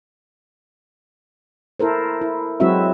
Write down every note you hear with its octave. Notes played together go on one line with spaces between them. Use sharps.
E4 A4 A#4 C5
E4
F#3 G#3 C4 E4 F#4 E5